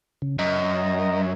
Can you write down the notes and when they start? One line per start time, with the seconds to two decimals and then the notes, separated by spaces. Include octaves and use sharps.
0.22 C#3
0.39 F#2 D#5 A#5